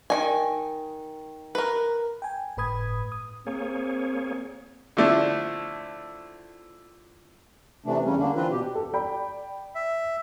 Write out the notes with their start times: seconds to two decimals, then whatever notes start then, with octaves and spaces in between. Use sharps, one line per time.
0.10 D#3 D#4 G#5
1.55 A#4 B4
2.22 G5 G#5
2.57 G1 A2 B4 B5 D#6 G#6
3.12 D#6
3.47 A#3 C4 G#4 C#5
4.97 D3 F3 A3 D4 E4
7.86 C3 E3 A3 D4
8.05 E2 C#3 G3 C#4
8.18 D3 A#3 D4
8.35 E3 C4 D4 F4 B4
8.51 B2 G4
8.75 A4
8.93 D5 G5 B5
9.75 E5